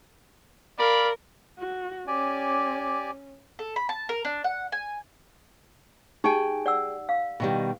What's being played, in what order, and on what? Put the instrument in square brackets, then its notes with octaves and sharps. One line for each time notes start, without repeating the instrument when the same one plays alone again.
[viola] A#4 [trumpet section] D5 F5 B5
[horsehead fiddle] F#4
[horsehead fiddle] C#4 [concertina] G4 D5 G#5
[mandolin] A4
B5
A5
A#4
D4
F#5
G#5
[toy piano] D#4 G4 [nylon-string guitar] G#4 G5 G#5
[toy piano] D5 F#5 E6
F5
[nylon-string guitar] B2 D#3 G3